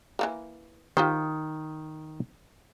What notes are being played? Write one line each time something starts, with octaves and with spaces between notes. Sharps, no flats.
E3 A3 A#3
D#3 F4 G4 C5